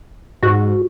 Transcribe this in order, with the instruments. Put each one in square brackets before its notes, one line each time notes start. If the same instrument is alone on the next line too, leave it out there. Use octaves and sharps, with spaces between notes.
[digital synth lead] G#2 [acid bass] F#4